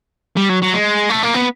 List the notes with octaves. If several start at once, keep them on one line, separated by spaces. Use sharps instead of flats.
G3
F#3
F#3
G#3
A3
A#3
B3